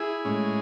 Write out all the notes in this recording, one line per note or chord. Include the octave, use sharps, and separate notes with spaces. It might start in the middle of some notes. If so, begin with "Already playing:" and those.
Already playing: E4 G#4
A2 G#3 C#4